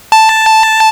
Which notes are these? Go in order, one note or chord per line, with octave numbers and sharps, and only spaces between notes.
A5